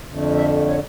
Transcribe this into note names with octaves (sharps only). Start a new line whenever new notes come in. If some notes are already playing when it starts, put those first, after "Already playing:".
F2 D3 A3
E5
C#5